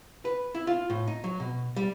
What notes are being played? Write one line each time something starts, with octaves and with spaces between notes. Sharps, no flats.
B4
E4
F4
A2
D#4
F#3
B2
G3